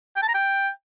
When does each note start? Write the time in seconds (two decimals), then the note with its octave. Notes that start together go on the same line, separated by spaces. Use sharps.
0.16 G5
0.22 A5
0.28 A#5
0.34 G5